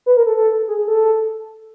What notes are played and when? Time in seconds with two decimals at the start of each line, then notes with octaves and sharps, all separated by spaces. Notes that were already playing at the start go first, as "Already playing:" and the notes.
0.06 B4
0.17 A#4
0.27 A4
0.37 A4
0.68 G#4
0.79 G#4
0.88 A4